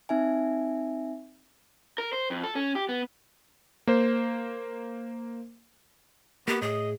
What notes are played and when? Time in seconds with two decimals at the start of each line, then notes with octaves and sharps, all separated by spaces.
0.09 C4 D#4 E5 G#5
1.98 A#4
2.13 C5
2.30 F2
2.44 A4
2.55 C#4
2.75 G4
2.89 B3
3.87 A#3 C5
6.48 A#3 B3 G4
6.62 A2 G#4 D#5